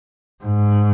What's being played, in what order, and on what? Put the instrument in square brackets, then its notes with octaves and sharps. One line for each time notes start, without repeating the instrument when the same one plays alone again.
[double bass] G#2